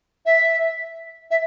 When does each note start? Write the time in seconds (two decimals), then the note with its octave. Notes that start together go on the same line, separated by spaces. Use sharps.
0.26 E5
1.31 E5